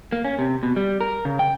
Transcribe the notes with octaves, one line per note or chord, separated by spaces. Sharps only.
A#3
C#4
C3
B2
G3
A#4
C#3
G5